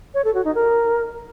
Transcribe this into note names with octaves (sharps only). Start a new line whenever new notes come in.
C#5
A4
F#4
D#4
A#4